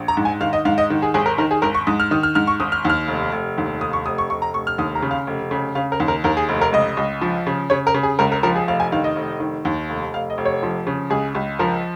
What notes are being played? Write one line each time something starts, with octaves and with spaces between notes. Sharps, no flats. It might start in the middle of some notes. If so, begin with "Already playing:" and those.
Already playing: A#1
A#5
G#2
G#5
D#3 F5
D#5
G#2 F5
D#5
D#3
G#4
G#1 G#4
A#4
D#3 A#4
G#4
G#1 A#4
C#6
G#2 D#6
F6
D#3 D#6
F6
G#2 F6
C#6
G#1 D#6
F6
D#2 F6
F1
F1
D#2
F1 D#6
C#6
F1 D#6
C#6
F1 C#6
A#5
F1 C#6
F6
D#2 D#6
A#5
C#3
F5
F1
C#3
C#3 F5
A#4
D#2
A#4
D#2 A#4
G#4
F1
A#4
C#2 D#5
C#2
F3
C#3
C#3 C#5
A#4
C#3
G#4
C#2 A#4
A#4
F3 A#4
G#4
F1 F5
G#5
D#3 F5
D#5
F1
D#3
D#2
F1
F1 F5
D#5
F1
C#5
F3
C#3
C#2 G#4
C#2
F3 A#4